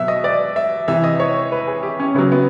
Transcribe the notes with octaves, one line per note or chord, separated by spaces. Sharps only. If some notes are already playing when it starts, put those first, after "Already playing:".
Already playing: B2 F#3 E5
D#5
D5
E5
C3 E3 E5
D#5
C#5
B4
G#4
G4
C#4
C#3 F#3 B3
B3